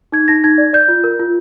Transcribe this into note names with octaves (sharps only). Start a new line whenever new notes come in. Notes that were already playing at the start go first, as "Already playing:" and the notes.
D#4 G#6
D#4 A#6
D#4 G#6
D5
D5 G6
F4
A#4
F4